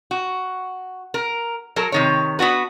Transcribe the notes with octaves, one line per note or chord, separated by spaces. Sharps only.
F#4
A#4
F#3 A4 A#4
C3 D#3 C#5
B3 D4 F#4 B4